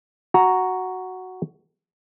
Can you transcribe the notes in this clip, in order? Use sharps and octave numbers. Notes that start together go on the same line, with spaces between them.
F#4 A#5